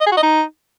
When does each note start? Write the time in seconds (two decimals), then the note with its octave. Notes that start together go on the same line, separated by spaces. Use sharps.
0.01 D#5
0.06 G#4
0.12 F#4
0.17 D#5
0.23 D#4